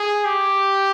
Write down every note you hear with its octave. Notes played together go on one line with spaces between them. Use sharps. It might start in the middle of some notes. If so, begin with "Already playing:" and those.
Already playing: G#4
G4